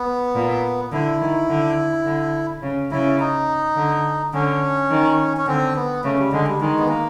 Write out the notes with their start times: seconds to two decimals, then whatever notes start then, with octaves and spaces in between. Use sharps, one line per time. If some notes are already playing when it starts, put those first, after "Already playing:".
Already playing: B3
0.35 A#2
0.92 D3 E4
1.21 D#3
1.49 D3
2.05 D3
2.63 C#3
2.92 C#3 E4
3.20 D#4
3.76 D3
4.33 D3 C#4
4.91 D#3
5.37 C#4
5.47 D3 C4
5.75 B3
6.04 C#3 A3
6.19 G3
6.33 D3 G#3
6.47 G3
6.61 D#3 G#3
6.79 B3
6.89 A#3